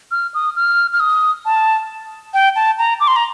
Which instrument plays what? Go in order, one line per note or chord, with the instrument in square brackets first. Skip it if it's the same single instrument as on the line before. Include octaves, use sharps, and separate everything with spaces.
[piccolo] F6
D#6
F6
F6
D#6
A5
G5
A5
A#5
D6
C6
A#5